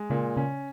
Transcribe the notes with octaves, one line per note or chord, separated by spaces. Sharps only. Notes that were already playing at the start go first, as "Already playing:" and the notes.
Already playing: G#3
A#2 C#3
C#3 C#4